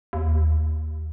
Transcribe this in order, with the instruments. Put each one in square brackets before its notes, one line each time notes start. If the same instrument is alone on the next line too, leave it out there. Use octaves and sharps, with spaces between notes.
[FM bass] D#2